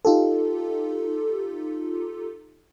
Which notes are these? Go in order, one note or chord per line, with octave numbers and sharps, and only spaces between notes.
D#4 F4 G4 A4